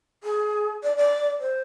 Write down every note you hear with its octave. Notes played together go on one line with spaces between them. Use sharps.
G#4
D5
D5
C5